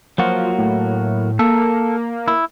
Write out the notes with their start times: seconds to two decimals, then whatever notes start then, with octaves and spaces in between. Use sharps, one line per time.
0.18 F3 F#3 A#3 F#4
0.59 A2
1.39 A#3 A4
2.28 E4